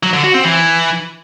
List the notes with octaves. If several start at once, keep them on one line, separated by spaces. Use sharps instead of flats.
F#3
D3
F#4
C4
E3